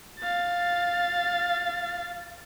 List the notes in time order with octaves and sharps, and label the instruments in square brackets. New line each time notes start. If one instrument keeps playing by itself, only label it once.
[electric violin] F5 A6